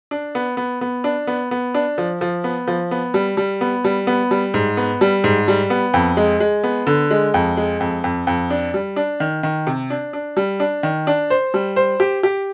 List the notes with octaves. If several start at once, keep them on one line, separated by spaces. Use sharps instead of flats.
D4
B3
B3
B3
D4
B3
B3
D4
F3
F3
B3
F3
B3
G3
G3
B3
G3
B3
G3
G#2
B3
G3
G#2
G3
B3
F2
G#3
G#3
B3
D3
G#3
F2
G#3
F2
F2
F2
D4
G3
D4
D#3
D#3
C3
D4
D4
G3
D4
D#3
D4
C5
G3
C5
G4
G4